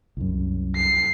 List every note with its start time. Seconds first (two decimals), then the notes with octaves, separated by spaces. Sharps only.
0.17 C2 F#2
0.76 C7